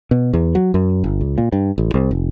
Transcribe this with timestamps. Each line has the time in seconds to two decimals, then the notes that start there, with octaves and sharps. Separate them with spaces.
0.11 B2
0.33 E2
0.55 F#3
0.74 F#2
1.04 G1
1.21 C#2
1.38 A#2
1.53 G2
1.78 A1
1.94 C2
2.11 F1